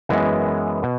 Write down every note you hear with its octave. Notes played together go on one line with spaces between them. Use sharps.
F#2 E3 G#3 B3
B2